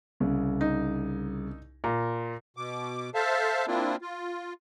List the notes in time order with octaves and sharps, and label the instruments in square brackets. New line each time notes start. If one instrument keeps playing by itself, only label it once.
[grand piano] C2 C#3
[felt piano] D#4
[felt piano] A#2 [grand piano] A#5
[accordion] B2 D6
A4 C5 E5 F5 A5
A#3 C4 D4 E4 F4
F4